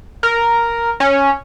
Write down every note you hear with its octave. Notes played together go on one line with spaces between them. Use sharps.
A#4
C#4